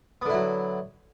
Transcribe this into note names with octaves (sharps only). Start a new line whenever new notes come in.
D3 F#3 B3 E4